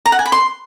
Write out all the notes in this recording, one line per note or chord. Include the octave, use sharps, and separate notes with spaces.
A#5
F#5
G#5
B5
C6